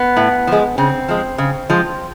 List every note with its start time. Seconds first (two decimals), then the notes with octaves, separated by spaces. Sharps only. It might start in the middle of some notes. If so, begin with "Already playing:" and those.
Already playing: B3
0.17 A2
0.47 F3 G#3
0.78 C#3 C4
1.08 F3 G#3
1.38 C#3
1.70 F3 G#3